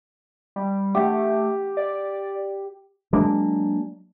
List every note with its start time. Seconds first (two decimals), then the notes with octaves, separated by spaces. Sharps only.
0.56 G3
0.95 A3 G4
1.77 D5
3.13 F#3 G#3 A#3 D4